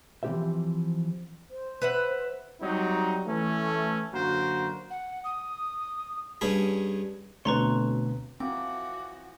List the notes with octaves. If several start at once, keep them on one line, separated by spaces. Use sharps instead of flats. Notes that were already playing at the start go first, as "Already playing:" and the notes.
E3 F3 C4 G4 C5 E5
C5
B4 E5 F#5
F#3 G3 C4 D#4
E3 A3 C#4
F#2 D3 A#3 F#4 A#4 C5
F#5
D#6
G2 C#4 G#4 B5
D2 B2 C4 A4 B4 C#5 A#5 C6
E3 F3 C4 F#4 A#4 D6